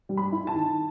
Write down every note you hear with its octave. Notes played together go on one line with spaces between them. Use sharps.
G3
B5
E4
A5
D#3